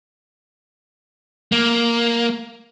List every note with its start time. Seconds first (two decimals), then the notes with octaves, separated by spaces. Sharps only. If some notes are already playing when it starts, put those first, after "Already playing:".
1.52 A#3